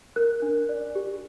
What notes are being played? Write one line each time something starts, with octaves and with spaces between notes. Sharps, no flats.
A#4 F#6
D4
D5
G4